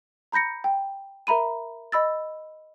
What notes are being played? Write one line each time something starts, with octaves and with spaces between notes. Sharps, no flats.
A#5 B5 G6 A#6 C#7
G5
A#4 E5 A#5 B5 D#7
D#5 B5 E6 A6